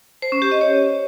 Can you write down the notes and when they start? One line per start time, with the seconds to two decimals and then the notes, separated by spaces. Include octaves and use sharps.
0.22 C5
0.32 C#4
0.42 G4
0.52 D#5
0.61 C#5